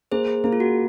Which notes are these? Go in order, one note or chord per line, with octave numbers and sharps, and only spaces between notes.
A#3 G#4 C5
G#4
A#3 G#4
F4
F#4